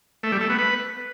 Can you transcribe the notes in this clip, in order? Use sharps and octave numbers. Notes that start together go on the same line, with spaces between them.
A3
G3
A3
B3
B4